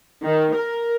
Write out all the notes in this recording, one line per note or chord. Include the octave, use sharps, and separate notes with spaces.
D#3
A#4